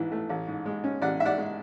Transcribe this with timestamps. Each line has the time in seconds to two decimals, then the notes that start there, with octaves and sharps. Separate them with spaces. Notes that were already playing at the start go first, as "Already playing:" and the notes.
Already playing: A1 G#2 E3
0.12 A3
0.29 A1
0.47 G#2
0.66 G#3
0.84 C#4
1.02 A1 D5 F#5
1.20 G#2 E5
1.25 D5 F#5
1.38 G#3